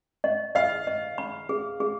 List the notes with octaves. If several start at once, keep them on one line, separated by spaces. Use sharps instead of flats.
D#5
D#5 F5
D#5
B5
G#4
G#4